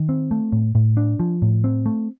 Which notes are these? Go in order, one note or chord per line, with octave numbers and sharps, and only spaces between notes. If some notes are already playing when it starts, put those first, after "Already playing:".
Already playing: D#3
C4
A3
A2
A2
D4
F3
A2
C4
A3